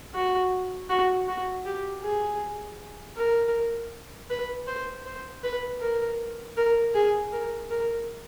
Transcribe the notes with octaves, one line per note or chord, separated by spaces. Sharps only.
F#4
F#4
F#4
G4
G#4
A#4
B4
C5
C5
B4
A#4
A#4
G#4
A#4
A#4